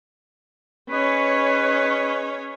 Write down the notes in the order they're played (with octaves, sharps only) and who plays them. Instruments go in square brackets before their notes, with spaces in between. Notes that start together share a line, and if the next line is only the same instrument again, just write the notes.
[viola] C#4 C#5 [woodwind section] D#4 G#4 B4